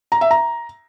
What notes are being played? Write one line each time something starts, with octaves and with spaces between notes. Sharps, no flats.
A#5
E5
A#5